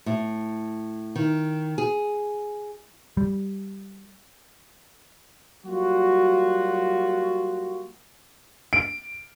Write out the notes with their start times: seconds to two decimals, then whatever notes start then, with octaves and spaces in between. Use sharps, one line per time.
0.06 A2
1.16 D#3
1.78 G#4
3.17 G3
5.66 F#3 G3 A#3 F4 F#4
8.73 D7